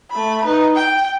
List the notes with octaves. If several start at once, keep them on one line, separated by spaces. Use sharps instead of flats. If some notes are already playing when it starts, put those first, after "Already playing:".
A3 B5
D#4 B4
G5